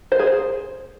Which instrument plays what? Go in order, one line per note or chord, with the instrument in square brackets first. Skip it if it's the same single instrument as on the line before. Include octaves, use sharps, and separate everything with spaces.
[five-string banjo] C5
G#4
C5